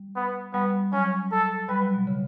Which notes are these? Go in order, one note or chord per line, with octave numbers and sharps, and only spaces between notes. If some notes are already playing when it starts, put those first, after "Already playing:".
Already playing: G3
B3
G3 B3
F#3 C#4
A4
G3 B4
F#3
B2
C#3